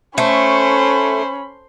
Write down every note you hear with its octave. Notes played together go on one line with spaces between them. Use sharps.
A3 C#4 C5 B5